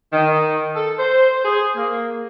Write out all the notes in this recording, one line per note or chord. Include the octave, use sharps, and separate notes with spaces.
D#3
A4
C5
G#4
A#3